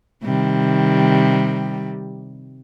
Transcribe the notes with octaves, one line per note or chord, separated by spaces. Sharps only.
C3 D#3 G3